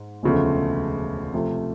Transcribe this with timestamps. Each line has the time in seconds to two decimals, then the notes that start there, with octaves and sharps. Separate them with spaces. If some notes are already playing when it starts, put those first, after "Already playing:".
Already playing: G#2
0.23 E1 D2 C#3 F3 A3
1.33 C3 F3 A3